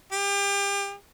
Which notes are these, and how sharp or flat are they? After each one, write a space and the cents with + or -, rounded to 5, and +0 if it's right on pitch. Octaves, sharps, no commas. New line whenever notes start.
G4 +35